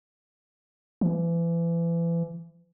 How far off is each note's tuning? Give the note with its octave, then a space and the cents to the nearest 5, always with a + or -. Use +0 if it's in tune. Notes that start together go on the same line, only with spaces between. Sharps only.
E3 +35